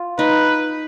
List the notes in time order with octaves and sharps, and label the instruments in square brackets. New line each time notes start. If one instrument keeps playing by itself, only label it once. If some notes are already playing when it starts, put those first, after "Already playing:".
Already playing: [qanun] F4
[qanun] D#4 [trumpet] B4